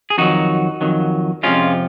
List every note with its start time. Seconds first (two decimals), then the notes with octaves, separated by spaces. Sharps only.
0.10 G#4
0.18 F2 D#3 F#3 D#4 F#4
0.81 F2 D#3 F#3
1.43 F2 C3 F3 G#3 C#4 F4